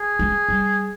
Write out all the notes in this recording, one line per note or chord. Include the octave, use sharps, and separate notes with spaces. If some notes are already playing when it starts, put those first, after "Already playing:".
Already playing: G#4
G#3
G3